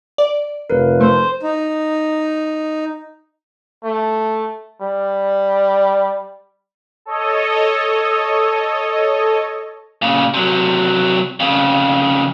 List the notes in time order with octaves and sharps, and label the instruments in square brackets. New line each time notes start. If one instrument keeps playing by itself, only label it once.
[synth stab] D5
[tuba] F1 [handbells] A#4 B4
[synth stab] A3 [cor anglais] C5
[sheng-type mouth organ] D#4
[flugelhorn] A3
G3
[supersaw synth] A4 C#5 D#5
[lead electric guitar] A#2 C#3
C3 F#3
F2 C#3